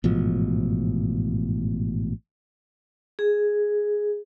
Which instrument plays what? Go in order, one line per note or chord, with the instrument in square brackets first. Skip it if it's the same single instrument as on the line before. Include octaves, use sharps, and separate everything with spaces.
[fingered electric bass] A1 G#2 B2 F3
[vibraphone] G#4